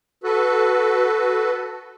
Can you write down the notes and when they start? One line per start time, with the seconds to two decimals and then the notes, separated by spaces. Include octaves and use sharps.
0.23 F#4 A4 B4